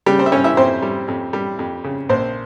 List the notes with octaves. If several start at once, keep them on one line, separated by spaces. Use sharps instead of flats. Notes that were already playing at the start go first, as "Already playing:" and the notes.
C#3 G3 G4
C4 C5
E5
G3 C#4 C#5
E4 E5
F2 C4 C5
G3
F2
G3
F2
C#3
A#1 C4 C5